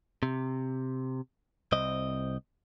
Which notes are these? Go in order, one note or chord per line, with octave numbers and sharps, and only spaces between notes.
C3
C2 C4 D#5